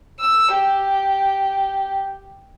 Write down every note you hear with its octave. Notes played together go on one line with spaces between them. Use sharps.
E6
G4